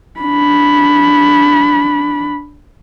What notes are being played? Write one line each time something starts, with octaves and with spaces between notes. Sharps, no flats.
D4 B5